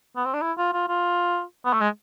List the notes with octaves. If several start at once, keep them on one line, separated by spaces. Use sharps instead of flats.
B3
C4
D4
E4
F4
F4
F4
B3
A3
G#3